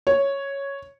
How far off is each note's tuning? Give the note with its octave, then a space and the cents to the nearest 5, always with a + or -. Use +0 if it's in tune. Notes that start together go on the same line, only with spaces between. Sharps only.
C#5 +0